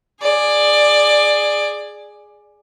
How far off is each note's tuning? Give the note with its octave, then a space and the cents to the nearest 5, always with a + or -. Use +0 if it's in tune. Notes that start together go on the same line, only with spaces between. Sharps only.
G#4 +0 D5 +15